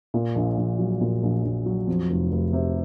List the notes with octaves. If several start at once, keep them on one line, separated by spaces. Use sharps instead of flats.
A#2
A#1
A#1
F#3
A#2
A#1
A#1
F#3
F2
F1
F1
C3